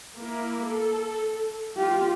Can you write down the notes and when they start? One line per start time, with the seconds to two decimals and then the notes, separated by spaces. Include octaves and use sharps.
0.17 A#3 E4
0.67 A4
1.77 F4 G4